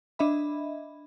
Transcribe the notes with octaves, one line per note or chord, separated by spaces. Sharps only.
D4 D#5 E5 B5